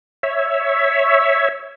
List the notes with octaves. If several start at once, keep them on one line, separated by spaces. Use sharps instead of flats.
C#5 E5